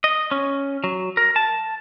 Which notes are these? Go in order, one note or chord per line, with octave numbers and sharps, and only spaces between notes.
D#5
C#4
F#3
A#4
A5